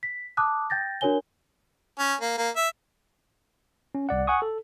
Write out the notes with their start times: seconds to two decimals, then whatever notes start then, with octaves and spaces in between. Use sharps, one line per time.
0.03 B6
0.37 A5 D6 D#6 F#6
0.70 G5 G6 A6 A#6
1.01 D4 F#4 A#4 C#5 G#5 G7
1.99 C#4
2.21 A#3
2.38 A#3
2.56 E5
3.95 C#4
4.09 C2 D5 F#5
4.27 F#5 G#5 C#6 D#6
4.42 A4